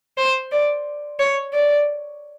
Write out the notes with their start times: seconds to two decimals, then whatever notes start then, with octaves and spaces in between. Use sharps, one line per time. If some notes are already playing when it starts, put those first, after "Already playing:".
0.18 C5
0.52 D5
1.19 C#5
1.53 D5